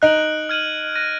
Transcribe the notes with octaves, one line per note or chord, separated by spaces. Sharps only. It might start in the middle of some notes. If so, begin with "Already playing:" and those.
D#4 F#6 D7 F#7
F6 G#6 D#7 F#7
F#6 A#6 D#7